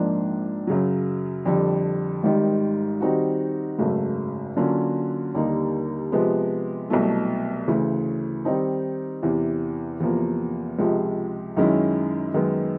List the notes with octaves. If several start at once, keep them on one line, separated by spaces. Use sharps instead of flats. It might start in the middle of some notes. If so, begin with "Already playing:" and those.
Already playing: A#1 G#2 F3 A#3 D4
F#2 C#3 F#3
F2 D3 G3
G#1 G#2 D#3 G3
D#3 G3 C4 D#4 F#4
G#1 F#2 C#3 F#3 A3
D3 F#3 A#3 C#4 F4
D#2 D3 G3 A#3 D#4
C3 F3 G#3 B3
C2 B2 F#3 A3
D2 C#3 E3
D#3 G3 C4 D#4
E2 C3 E3
E2 C3 F3 A#3
C#2 C3 F3 G#3
F#2 D#3 G#3 C#4 E4
F#2 D#3 G#3 B3